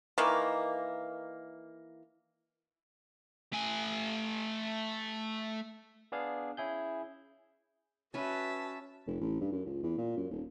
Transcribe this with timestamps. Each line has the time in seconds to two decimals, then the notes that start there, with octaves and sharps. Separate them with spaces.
0.18 D#3 E3 A#3
3.53 A3 G#5
6.12 B3 D4 G#4 F5
6.57 C#4 E4 G#4 G6
8.14 C#4 F#4 B4 E5 A5
9.07 F1
9.21 A1
9.41 G2
9.52 F#2
9.66 C#2
9.83 E2
9.97 A#2
10.17 F#2
10.30 D#1